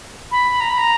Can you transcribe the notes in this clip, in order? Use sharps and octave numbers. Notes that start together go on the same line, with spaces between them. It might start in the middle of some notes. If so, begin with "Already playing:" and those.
B5
A#5
B5
A#5